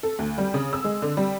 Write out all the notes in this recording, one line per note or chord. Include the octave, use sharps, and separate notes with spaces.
A4
D2
G3
C#3
E6
G#3
D3
G3